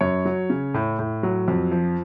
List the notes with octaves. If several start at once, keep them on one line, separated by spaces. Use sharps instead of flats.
F#2 C#5
F#3
C#3
A2
A2
F#3
F2
F3